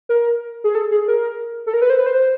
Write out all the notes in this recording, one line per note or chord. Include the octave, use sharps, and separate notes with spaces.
A#4
G#4
A4
G#4
A#4
A4
A#4
B4
C5
B4
C5